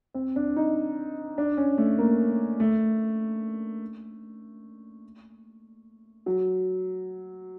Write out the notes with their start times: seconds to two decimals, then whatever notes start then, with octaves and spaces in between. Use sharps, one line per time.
0.14 C4
0.36 D4
0.56 D#4
1.38 D4
1.57 C#4
1.78 A3
1.98 A#3
2.60 A3
6.26 F#3